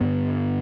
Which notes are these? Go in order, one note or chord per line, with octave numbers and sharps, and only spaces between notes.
G2 D3 B3